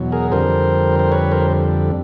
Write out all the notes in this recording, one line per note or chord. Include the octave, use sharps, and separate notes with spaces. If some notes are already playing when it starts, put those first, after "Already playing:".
Already playing: E2 B2 F#3
G#4 A#4
F2 D3 G3 A#4 C5
C5
B4 C#5
A#4 C5